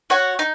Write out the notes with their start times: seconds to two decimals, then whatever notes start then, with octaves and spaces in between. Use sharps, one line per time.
0.10 F#4 C#5 F#5
0.39 D#4